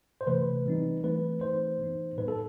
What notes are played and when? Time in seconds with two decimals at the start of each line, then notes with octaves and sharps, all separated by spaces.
0.21 C5
0.27 C3 E3 A3 B4
0.66 E3 G3 C4 D#4
1.03 E3 A3 C4 B4
1.41 E3 A3 D#4 C5
1.80 E3 B3 D#4
2.18 A2 G3 B3 D#4 B4
2.28 A4